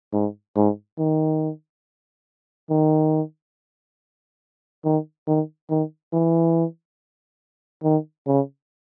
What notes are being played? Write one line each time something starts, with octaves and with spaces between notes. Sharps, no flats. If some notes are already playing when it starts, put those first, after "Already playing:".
G#2
G#2
D#3
D#3
D#3
D#3
D#3
E3
D#3
C#3